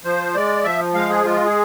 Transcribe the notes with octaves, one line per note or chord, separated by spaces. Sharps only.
F3 C5
G#3 D5
F3 E5
G#3 F5
G#4
G#3 F4
G#4